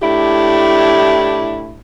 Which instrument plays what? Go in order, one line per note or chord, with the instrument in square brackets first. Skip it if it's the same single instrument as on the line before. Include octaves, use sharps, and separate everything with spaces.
[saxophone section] A2 D4 E4 G4